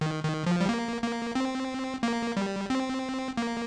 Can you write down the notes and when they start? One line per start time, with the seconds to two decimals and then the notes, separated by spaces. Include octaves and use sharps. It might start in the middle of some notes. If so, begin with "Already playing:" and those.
0.01 D#3
0.24 D#3
0.46 F3
0.61 G3
0.69 A#3
1.02 A#3
1.35 C4
2.03 A#3
2.37 G3
2.70 C4
3.37 A#3